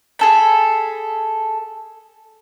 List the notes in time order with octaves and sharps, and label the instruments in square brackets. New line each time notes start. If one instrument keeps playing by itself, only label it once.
[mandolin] G#4 A4 B5